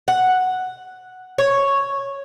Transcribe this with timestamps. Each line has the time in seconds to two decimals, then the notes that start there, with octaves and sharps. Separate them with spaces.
0.08 F#5
1.38 C#5